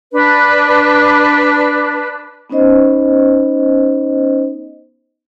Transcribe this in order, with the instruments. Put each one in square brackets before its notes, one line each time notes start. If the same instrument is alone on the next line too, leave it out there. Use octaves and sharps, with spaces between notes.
[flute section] D4 B4
[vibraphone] B3 C#4 D#4 C5 D#5